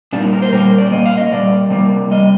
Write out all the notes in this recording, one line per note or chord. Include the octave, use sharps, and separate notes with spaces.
A#2 G3 A#3 D4
D#4
A#4
C5
A#2 G3 A#3 A#4
C5
D5
A#2 G3 A#3 D#5
F5
D#5
A#2 G3 D5
C3 G3 A#3
C3 G3 D#5